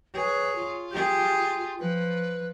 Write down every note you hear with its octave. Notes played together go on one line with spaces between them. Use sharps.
G#4 B4 C#5
F4
G4 G#4
F3 B4